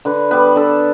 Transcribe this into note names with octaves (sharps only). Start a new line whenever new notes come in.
D3 B4
G3 B3 B4
D3 A4